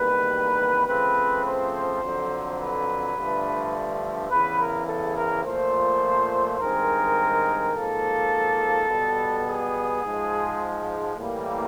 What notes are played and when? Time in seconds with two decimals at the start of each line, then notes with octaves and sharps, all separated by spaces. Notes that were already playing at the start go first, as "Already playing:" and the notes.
Already playing: E2 C3 D#3 G3 A#3 B4
0.87 C#3 F3 A3 C4 B4
1.44 C5
2.01 F2 D3 F#3
2.59 B4
3.16 G2 D3 F3 A3
4.30 E2 C#3 E3 B4
4.59 A#4
4.87 A4
5.15 A#4
5.44 A#2 F3 A3 C5
6.58 G2 D#3 G#3 C4 A#4
7.73 G#2 F3 A#3 A4
8.88 B2 G3 B3
9.44 G#4
10.02 G#2 F3 G#3
11.17 A2 E3 G3 A#3